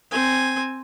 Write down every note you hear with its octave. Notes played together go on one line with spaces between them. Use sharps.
C4 G#5